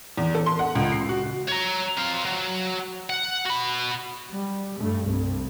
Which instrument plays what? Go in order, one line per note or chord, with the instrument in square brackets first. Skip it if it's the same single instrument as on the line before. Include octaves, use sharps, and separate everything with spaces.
[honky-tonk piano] E2
A4
C6
F#5
C#2
C7
F#4
[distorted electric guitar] C#5 A#5
C4 F5
F#3
F#5
F#4 B5
[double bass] G3
G2 A3
C2 G2